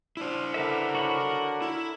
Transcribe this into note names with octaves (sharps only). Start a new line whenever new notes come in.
D4 E4 C5
D3 A#4 B4 E5
F#4 C#5 B5
E4